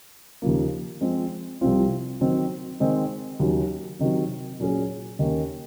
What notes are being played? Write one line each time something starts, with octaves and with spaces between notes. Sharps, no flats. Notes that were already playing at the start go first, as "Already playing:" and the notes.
D#2 C#3 F3 A#3
F3 G#3 C4
C2 C3 F3 C4 F4
D#3 F#3 C4 F#4
D#3 G#3 C4
D#2 C#3 F#3 C#4 F#4
C3 D#3 F#3 C4
A#2 F#3 C#4 G#4
D#2 D#3 A#3 C#4